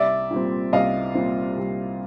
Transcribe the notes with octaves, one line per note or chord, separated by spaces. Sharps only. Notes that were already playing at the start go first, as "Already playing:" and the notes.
Already playing: C2 D5 E5
A#2 G3 C4
C2 D#5 F5
A#2 G3 C4
C2